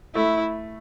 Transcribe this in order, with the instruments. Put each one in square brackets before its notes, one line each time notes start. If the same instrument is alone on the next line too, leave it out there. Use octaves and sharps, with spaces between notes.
[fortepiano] A3 [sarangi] E4